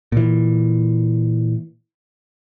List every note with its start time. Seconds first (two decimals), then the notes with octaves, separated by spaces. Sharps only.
0.12 A#2 E3